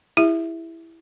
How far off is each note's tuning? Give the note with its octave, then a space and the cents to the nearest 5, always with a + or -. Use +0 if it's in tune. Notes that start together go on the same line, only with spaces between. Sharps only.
E4 +0 G4 +45 E5 +0